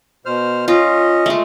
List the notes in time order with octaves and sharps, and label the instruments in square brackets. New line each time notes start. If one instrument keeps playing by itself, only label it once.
[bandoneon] B2 C5 F6
[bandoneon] C#4 D#5 [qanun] F4
[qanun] G#3 A3